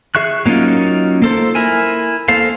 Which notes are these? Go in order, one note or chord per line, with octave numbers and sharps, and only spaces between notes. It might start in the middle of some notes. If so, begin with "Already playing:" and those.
G#4 E5 C#6 F#6
F#3 A#3 C#4 D#4 F4
A#3 A4 C5
E4 A#4 G#5
A#3 A4 C5 F5